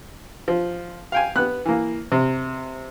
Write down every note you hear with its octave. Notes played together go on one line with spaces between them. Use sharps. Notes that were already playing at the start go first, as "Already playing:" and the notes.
F3
F5 G5 G#5
B3 F#6
E3 A#3
C3